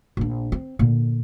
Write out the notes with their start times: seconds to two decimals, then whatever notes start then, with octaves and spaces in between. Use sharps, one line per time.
0.17 A#1 D4
0.52 C4
0.79 A#2 D3